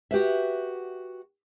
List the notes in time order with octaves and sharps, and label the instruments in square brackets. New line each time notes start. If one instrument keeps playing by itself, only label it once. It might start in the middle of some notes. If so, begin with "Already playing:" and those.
[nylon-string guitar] F#4 G4 B4 E5